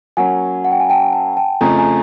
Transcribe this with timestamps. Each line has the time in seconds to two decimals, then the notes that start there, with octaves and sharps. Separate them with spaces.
0.17 F#3 A#3 C#4 F#5 G#5
0.65 F#5
0.72 G5
0.80 G#5
0.90 G5 A5
1.13 G5 A5
1.37 G5 A5
1.61 F2 C#3 F3 A3 G#5 A#5
1.78 G#5 A#5